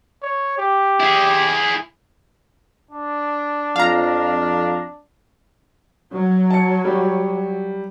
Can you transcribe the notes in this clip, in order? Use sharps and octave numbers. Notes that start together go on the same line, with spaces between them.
C#5
G4
E4 G#4
D4
F2 F5 A#5
F#3
A5 C#7
G3